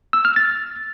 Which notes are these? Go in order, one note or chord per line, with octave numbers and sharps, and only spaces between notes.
E6
F6
A6